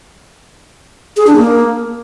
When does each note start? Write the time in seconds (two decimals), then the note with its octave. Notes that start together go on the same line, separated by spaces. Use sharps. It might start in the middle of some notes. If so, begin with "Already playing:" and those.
1.17 G#4
1.27 D4
1.37 A#3